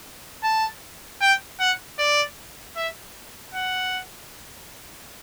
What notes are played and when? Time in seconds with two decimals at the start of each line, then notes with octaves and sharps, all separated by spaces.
0.43 A5
1.21 G5
1.60 F#5
1.98 D5
2.76 E5
3.55 F#5